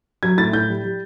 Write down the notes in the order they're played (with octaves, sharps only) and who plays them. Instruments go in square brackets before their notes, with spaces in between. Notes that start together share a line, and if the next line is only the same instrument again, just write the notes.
[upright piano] F#3 G#6
A2 A6
A2 G6
G3
G3